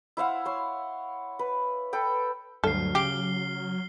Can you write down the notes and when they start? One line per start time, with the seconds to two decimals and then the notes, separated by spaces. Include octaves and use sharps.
0.17 E4 C5 F5 F#5
0.45 C#5 C6
1.39 B4
1.93 A4 B4 G5
2.64 D2 G2 F#3 A4 F6 C7
2.95 C#3 G4 C7 G7